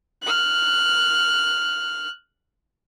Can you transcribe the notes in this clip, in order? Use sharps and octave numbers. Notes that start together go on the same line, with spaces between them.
F6 F#6